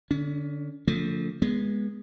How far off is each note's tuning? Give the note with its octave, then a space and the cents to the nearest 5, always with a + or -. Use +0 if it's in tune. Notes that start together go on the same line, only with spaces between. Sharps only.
D3 +0 C#4 +30
D3 -45 F3 +0 A3 +25
G#3 -5 B3 -25